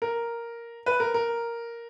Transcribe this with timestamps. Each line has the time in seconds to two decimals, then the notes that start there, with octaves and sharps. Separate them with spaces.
0.02 A#4
0.86 B4
1.00 A#4
1.14 A#4